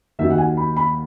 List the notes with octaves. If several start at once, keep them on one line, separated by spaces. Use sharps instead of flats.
D#2 D#3 F#3 E5
F#5
G#5
B5
B5